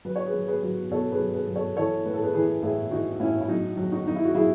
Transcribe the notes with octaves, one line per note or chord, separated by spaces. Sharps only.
F#3 B4
C#5
G#4 B4
F#3
G#4 B4
F#3
B2 A4 C#5
G#4 B4
F#3
G#4 B4
F#3
A4 C#5
E3 A4 C#5
A2 B4
A4
G#4 B4
E3 G#4 B4
A2 E4 G#4
E3 D#4 F#4
A2 C#4 E4
E4
F#3 D#4
F#3
D#4 F#4
F#3 D#4
E4
F#4
F#3 E4 G#4